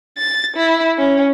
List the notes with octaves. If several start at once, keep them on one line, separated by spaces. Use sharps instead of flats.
A6
E4
C#4